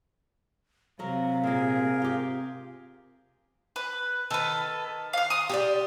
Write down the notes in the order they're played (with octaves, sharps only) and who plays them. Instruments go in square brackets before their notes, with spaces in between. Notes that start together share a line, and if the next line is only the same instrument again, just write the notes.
[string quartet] C3 [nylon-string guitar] F#3 A#4 [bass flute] F5
[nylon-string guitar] A#2 A#3 [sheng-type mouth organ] G#4 A#4
[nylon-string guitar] F4 G4
[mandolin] B4
[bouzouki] D#3 [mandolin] A4 B4
[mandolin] F5 F6
C6 D#6
[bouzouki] G4 G#4 D5